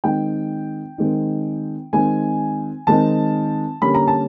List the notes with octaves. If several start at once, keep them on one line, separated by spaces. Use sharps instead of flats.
D#3 G#3 C4 D#4 G5
D#3 G#3 C4 D#4
D#3 G#3 C4 D#4 G#5
D#3 G#3 C4 D#4 A5
D3 G3 A#3 C#4 B5
A#5
A5